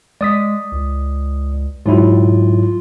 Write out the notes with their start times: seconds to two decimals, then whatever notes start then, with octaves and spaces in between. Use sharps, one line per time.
0.21 G#3 D5 D#6 B6
0.72 C#2
1.86 G#2 F#3 E4 F4